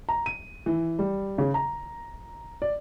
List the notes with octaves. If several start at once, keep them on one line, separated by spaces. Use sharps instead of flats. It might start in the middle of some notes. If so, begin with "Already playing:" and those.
A#5
D#7
E3
G3
C#3
A#5
D5